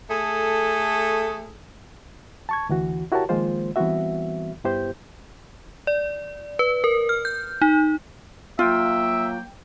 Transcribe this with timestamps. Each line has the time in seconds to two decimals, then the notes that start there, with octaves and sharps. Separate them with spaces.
0.09 A3 G#4 A4
2.49 A5 C#6 G#6
2.69 D2 E3 F#4
3.12 E4 F#4 G4 A#4 C#5 A5
3.29 D#3 F3 G#3 A#3 F4 C5
3.76 E3 G3 B3 C4 F#4 E5
4.64 G2 B3 E4 G4 C5 G6
5.87 D5
6.59 B4
6.84 A#4
7.09 F6
7.25 G6
7.62 D#4
8.59 F#3 A#3 F4 E5 G5